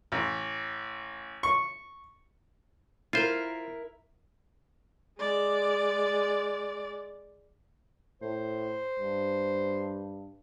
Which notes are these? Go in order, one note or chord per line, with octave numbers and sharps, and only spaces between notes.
A1
C#6
E4 F4 A#4 C5
G#3 D5
A2 C5
G2